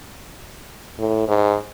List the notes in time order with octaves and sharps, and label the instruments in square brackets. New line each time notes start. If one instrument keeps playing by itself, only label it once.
[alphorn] A2
G#2